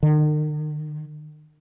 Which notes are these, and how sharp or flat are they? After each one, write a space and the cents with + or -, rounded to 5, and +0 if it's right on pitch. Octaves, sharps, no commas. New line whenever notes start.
D#3 -45